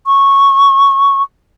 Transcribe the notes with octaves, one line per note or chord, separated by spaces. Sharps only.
C#6